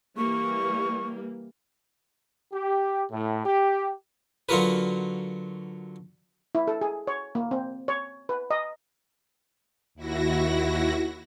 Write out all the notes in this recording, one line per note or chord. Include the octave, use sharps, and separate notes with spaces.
E3 G3 A#3 C#6
G4
A2
G4
D3 F#3 F4 F#4 A#4 B4
E4
A4
G#4
C#5
A#3
C4
C#5
B4
D#5
D#2 E4 F#4 A#6